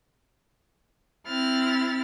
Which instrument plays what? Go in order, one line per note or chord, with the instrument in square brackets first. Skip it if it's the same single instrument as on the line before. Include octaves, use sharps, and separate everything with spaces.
[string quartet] C4 E4 F6 A6